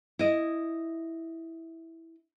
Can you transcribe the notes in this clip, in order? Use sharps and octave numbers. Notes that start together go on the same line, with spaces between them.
E4 D#5